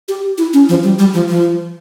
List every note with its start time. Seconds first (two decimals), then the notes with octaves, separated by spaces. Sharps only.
0.08 G4
0.38 E4
0.54 C#4
0.69 F3
0.84 G3
0.99 G3
1.14 F3
1.29 F3